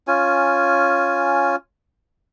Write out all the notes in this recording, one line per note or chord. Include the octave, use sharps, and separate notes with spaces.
C#4 F4 G#5